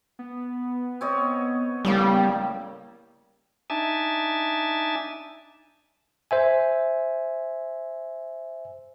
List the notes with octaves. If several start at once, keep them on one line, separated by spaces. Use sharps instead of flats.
B3
C4 C#5 D#5
A2 C#3 G3 A#3
D4 D#4 E5 G#5 A5
C5 E5 G#5